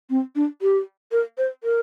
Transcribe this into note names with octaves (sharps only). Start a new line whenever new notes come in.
C4
D4
G4
A#4
C5
A#4